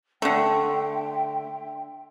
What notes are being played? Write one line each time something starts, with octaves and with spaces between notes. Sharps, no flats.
D3 A3 E5 G5 C6